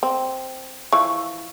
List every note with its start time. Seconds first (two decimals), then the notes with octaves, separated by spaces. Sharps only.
0.03 C4
0.92 E3 F3 C#6